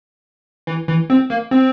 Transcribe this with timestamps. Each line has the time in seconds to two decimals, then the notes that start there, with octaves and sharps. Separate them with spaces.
0.67 E3
0.88 E3
1.10 C4
1.30 A#3
1.51 C4